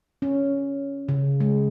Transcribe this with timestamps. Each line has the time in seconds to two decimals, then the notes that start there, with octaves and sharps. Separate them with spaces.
0.22 C#4
1.09 C#3
1.40 G#3